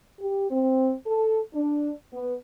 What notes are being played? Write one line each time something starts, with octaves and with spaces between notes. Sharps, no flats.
G4
C4
A4
D4
B3